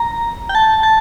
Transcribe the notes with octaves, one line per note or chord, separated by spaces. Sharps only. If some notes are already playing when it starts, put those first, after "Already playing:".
Already playing: A#5
G5
A5
A5